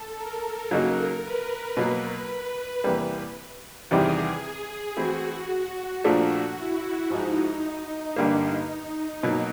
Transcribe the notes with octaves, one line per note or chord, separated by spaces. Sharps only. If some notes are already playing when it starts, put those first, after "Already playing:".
Already playing: A4
A#4
C#3 F#3 A#3 D#4 F#4
B4
B2 F#3 A#3
B4
E2 C3 E3 G3 A#3
E2 C3 D#3 G3 G#4
E3 A3 C4 E4 F#4
A#2 F3 A3 D4
E4
G#2 F3 G#3 D#4
G2 D3 G3 A#3
B2 F#3 A#3